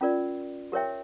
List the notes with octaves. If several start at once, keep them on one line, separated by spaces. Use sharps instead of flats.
C#4 F4 A#4 D5
G4 A#4 C#5 E5 G5